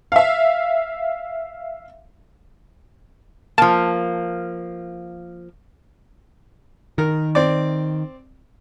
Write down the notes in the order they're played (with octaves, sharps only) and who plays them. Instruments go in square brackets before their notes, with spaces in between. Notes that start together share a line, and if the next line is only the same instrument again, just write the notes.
[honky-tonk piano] E5 F5
[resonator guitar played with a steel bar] F3 A#3 [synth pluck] A5
[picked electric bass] D#3 [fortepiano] A#4
[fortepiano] C4 D5